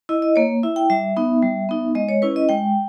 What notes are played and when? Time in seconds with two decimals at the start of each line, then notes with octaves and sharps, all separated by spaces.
0.09 E4 D#5
0.22 D#5
0.36 A#3 C#5
0.63 E4 E5
0.76 G5
0.90 G3 E5
1.16 B3 D#4
1.42 G3
1.69 B3 D#4
1.95 G#3 D#5
2.09 C#5
2.22 C#4 E4 B4
2.36 D#5
2.49 G#3 G5